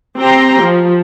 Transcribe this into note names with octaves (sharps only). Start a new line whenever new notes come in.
C4 G4 G5 A#5 C6
F3